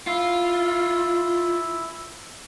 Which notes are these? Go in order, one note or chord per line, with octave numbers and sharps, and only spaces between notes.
E4 F4